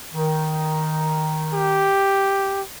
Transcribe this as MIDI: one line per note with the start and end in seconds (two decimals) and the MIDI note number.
0.13 1.92 51
1.54 2.61 67